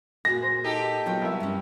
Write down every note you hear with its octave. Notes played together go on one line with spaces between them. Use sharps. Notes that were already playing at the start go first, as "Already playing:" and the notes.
A#2 F#4 G#4 A#6
C5
D#4 G4 A4
F#3 B3 F4 C#5 G5
C2 A#4 E5
G2 C#4